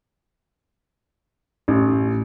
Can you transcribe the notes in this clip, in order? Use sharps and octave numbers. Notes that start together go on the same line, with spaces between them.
A1